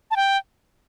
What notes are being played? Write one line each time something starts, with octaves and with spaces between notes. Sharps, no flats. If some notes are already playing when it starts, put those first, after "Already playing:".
A5
G5